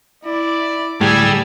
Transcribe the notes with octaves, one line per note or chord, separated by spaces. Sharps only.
E4 D5
D2 A2 G3 G4 G#4 G#5 E6